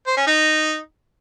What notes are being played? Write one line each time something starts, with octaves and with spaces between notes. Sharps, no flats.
C5
C#4
D#4